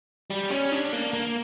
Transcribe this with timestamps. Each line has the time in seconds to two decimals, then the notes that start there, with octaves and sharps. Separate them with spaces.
0.30 G3
0.51 C#4
0.72 D4
0.93 A#3
1.13 A#3